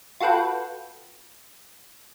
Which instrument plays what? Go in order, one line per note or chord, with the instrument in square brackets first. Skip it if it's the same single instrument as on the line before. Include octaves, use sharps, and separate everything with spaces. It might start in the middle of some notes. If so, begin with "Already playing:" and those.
[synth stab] F4 F#4 A4 B4 G5